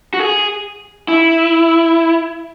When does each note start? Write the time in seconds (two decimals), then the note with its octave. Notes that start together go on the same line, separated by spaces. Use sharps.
0.14 F#4
0.20 G#4
1.08 E4